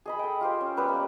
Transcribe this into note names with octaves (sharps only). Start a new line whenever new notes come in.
G#4 D#5 B5
A4 G5
F4 G4 C5
C#4
G3 B3 B4 E6
A#3